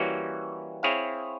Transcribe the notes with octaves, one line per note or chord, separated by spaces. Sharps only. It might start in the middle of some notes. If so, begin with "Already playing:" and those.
Already playing: E3 G3 A#3 C#4 F#4
C4 E4 G#4 C#5 F5